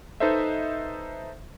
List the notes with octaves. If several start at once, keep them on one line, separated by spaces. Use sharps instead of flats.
D#4 A4 B4 C5 D#5 E5